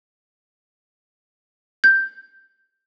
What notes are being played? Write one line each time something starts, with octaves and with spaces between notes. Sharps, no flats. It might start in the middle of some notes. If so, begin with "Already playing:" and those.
G6